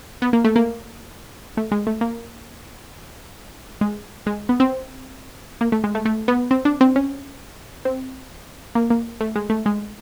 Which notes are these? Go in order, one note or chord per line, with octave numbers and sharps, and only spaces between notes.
B3
A#3
A3
A#3
A3
G#3
A3
A#3
G#3
G#3
B3
C4
A#3
A3
G#3
A3
A3
B3
C4
D4
C4
C#4
C4
A#3
A#3
A3
G#3
A3
G#3